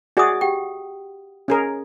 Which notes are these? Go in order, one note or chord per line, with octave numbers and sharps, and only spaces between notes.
F#4 G#4 D5 E5 D#6
G4 F#5 G5
C#4 G#4 A#4